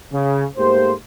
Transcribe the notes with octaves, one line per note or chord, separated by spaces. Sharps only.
C#3
G#2 A3 A#3 G4 C5